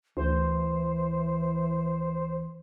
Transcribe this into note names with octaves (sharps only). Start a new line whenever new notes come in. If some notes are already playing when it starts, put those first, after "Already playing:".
D2 E3 C5